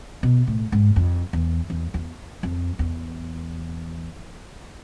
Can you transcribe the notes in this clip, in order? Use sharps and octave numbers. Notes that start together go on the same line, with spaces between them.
B2
A2
G#2
F2
E2
E2
E2
F2
E2